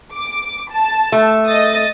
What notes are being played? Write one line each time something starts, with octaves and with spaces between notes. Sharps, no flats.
D6
A5
A3
D#5 D#6 A6